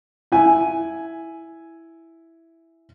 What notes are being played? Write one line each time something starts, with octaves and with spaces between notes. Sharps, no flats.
E4 G#5